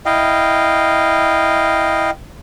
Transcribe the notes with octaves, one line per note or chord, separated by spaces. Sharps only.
E4 D#5 F5 G5